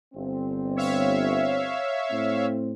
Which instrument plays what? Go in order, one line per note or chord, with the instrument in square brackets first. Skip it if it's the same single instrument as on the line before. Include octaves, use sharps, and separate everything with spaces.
[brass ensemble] G1 C4
[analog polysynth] C#5 E5 F5
[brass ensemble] A2 C4